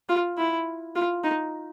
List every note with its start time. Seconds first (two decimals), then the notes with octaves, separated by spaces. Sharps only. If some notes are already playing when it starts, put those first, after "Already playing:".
0.09 F4
0.38 E4
0.96 F4
1.24 D#4